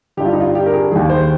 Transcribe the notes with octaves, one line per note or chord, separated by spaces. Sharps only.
G2 D3 G4
F4
D#4
F4
G4
A#4
G#4
D#2 D#3 G#4
C5